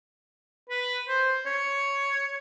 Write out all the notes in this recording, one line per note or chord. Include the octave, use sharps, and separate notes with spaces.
B4
C5
C#5